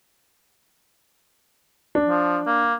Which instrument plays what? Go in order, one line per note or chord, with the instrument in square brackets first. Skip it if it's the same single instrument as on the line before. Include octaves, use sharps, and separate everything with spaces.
[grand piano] D4
[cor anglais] F3
A#3